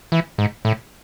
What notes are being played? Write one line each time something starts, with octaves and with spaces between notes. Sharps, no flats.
E3
G#2
A2